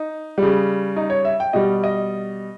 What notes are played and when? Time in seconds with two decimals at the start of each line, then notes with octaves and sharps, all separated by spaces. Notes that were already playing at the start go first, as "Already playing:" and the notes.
Already playing: D#4
0.38 C#3 G3
0.97 D#4
1.10 C#5
1.25 E5
1.40 G5
1.53 B2 G3 D#5
1.84 D#5